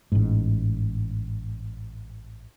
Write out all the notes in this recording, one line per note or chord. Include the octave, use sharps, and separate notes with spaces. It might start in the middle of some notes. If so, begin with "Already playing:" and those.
A1 G#2